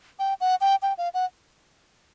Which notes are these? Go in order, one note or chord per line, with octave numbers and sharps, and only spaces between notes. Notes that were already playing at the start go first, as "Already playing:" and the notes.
G5
F#5
G5
G5
F5
F#5